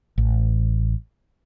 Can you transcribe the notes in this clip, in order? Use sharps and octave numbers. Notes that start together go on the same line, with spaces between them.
A1